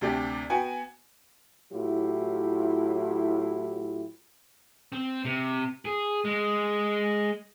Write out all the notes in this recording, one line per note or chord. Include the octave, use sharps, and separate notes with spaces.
D2 C3 D4 G4
B3 F#4 G5 G#5
A2 F#3 E4 F4 G4
C4
C3
G#4
G#3